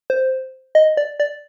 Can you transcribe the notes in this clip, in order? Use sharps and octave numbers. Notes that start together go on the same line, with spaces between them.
C5
D#5
D5
D5